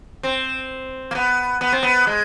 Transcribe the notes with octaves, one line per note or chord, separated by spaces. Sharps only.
C4
A#3
B3
B3
C4
B3
G#3